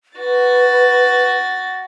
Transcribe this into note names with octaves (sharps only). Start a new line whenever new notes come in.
F#4 B4 A6